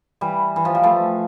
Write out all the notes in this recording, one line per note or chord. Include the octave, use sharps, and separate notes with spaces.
E3 G3
E3
F3
G3
F3 A3